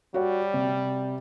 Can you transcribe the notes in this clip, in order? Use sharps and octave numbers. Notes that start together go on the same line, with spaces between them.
G3 F#4 C#5 F#5
C3